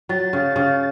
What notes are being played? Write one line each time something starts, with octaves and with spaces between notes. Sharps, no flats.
F#3 A6
C#3
C#3